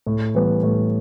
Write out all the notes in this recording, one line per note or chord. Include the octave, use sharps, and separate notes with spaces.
A2
E3 G3 B3
A2